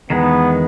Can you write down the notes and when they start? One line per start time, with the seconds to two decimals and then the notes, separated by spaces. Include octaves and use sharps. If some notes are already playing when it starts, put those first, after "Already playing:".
0.10 E2 D#3 G#3 B3